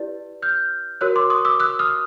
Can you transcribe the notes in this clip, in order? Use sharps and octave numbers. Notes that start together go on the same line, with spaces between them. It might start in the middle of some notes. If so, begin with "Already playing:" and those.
Already playing: E4 G4 B4 D5
F6 G6
F#4 A#4 C#5 E6 F#6
C6 D6
C#6 D#6
D6 E6
E6 F#6
D#6 F6